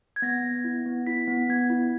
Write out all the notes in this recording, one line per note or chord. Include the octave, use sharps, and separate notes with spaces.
G#6
B3 A#6
B3
E4
B3
E4 B6
B3
B3 G#6
E4